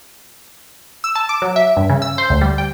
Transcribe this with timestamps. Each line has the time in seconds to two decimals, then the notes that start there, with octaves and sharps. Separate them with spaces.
1.04 E6
1.15 A5
1.29 D6
1.42 F#3
1.56 E5
1.77 G2
1.90 C#3
2.02 E6
2.18 C5
2.30 D2
2.41 G3
2.58 G5